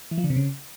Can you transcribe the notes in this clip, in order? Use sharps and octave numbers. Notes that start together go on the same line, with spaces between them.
E3
F3
D3
C3
C#3